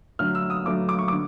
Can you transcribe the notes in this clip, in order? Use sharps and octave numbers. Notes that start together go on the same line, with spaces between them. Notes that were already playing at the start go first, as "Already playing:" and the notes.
D3 F#3 A3 F6
E6
D#6
D3 F#3 A3 D6
D6
C#6
D3 D6